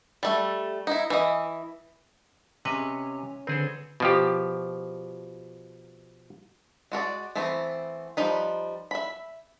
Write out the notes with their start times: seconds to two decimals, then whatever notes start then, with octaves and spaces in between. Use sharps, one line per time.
0.23 G3 A3
0.87 D#4 E4
1.10 E3 D#5
2.65 C3 C#4 B4 D#5
3.47 D3 C4 G#4 A4 B4
4.00 B2 F3 G4
6.92 G#3 F#4 A#4 D5
7.35 E3 A3 B3 C4
8.17 F3 G3 D#4 B4
8.91 E5 B5